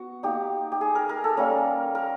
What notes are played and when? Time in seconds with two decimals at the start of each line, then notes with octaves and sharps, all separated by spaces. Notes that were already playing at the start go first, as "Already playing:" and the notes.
Already playing: B3 F#4
0.23 A#3 D#4 G4
0.72 G4
0.81 G#4
0.95 A#4
1.09 A#4
1.24 A4
1.37 G3 A#3 C#4 A#4
1.95 A#4